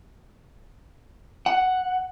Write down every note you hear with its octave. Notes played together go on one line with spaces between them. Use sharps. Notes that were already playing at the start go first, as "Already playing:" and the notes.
F#5